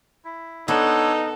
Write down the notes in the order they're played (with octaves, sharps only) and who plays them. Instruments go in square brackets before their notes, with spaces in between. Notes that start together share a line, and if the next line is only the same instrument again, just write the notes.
[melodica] E4
[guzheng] B3 [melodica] D4 C#5 E6 [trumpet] D#4 [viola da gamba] A4